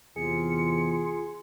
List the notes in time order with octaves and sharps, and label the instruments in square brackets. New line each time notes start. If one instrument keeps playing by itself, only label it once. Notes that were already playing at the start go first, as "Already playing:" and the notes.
[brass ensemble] E2 C3 [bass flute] F4 [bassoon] G#4 [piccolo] C#7